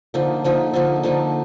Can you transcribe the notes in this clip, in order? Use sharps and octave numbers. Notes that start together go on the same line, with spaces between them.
D3 F3 A#3 D#4
D3 F3 A#3 D#4
D3 F3 A#3 D#4
D3 F3 A#3 D#4